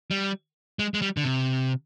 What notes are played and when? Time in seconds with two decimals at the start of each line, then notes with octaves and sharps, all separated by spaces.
0.11 G3
0.79 G#3
0.94 G#3
1.02 G3
1.17 D3
1.24 C3